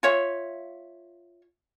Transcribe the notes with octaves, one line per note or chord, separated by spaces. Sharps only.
F4 C#5 E5